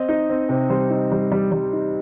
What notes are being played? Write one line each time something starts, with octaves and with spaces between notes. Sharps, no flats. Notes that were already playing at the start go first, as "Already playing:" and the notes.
Already playing: C4 D#5
D#4
C4
C3
G3 C5
D#4
G3
G3
G3
D#4